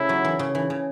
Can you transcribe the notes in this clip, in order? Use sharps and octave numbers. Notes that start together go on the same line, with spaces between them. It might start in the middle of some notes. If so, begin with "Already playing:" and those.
Already playing: C#3 A3 E4
F#3
E3
C#3
E3
C#3